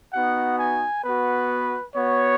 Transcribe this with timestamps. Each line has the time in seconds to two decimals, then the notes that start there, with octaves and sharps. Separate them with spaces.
0.13 B3 D#4 F#4 F#5
0.59 G#5
1.04 B3 F#4 B4
1.95 B3 F#4 C#5